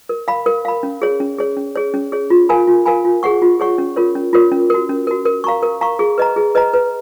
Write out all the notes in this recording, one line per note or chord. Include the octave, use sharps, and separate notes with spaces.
A#4
F5 B5
A#4
F5 B5
C#4
G#4 C#5
C#4
G#4 C#5
C#4
G#4 C#5
C#4
G#4 C#5
F4
A#4 F5 G#5 B5
F4
A#4 F5 G#5 B5
F4
G#4 C#5 F#5 C#6
F4
G#4 C#5 F#5 C#6
C#4
F4 A#4 C#5
C#4
F4 A#4 C#5
C#4
F#4 A#4
C#4
F#4 A#4
A#4
F5 A#5 C#6
A#4
F5 A#5 C#6
G#4
B4 D#5 A#5
G#4
B4 D#5 A#5
B4